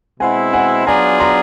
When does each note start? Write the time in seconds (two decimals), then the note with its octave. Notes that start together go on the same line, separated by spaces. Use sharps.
0.20 B2 G#3 C4 E4 F#5 G#5
0.53 F#5 G#5
0.87 F#3 B3 D4 F4 G#4 G#5 A#5
1.20 A#5 C6